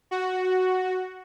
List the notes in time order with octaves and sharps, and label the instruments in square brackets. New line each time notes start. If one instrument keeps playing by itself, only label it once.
[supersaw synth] F#4